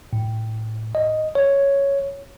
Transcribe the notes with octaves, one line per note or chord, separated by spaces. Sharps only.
A2
D#5
C#5